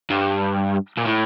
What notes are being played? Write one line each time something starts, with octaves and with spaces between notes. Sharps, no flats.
G2
A#2
A2